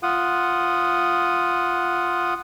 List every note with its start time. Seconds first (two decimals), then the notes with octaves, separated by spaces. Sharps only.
0.03 F4 F#5 D#6